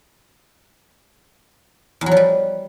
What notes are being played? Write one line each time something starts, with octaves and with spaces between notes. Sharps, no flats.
E2
F#3
F3
G3